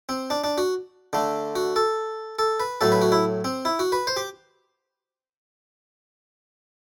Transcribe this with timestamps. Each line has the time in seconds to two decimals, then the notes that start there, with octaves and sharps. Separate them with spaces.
0.09 C4
0.30 D4
0.44 D4
0.58 F#4
1.13 D3 A3
1.56 F#4
1.76 A4
2.39 A4
2.60 B4
2.81 A2 F#3 A3 A4
2.92 B4
3.01 F#4
3.12 E4
3.44 C4
3.65 E4
3.79 F#4
3.92 B4
4.07 C5
4.16 G4